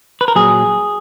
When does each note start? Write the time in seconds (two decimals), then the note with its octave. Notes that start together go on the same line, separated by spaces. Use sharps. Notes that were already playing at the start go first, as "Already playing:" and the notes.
0.21 B4
0.28 A#4
0.35 A#2 F#3 G#4